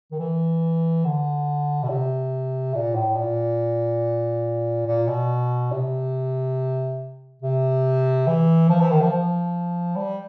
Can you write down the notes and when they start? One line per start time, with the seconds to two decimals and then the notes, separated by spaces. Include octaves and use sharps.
0.12 D#3
0.19 E3
1.05 D3
1.83 B2
1.90 C3
2.74 A#2
2.95 A2
3.17 A#2
4.87 A#2
5.08 B2
5.72 C3
7.42 C3
8.27 E3
8.70 F3
8.80 E3
8.91 D#3
9.02 F3
9.12 F3
9.97 G3